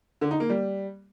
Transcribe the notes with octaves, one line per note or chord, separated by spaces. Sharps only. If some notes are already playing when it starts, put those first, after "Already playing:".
D3
D#4
A#3
G3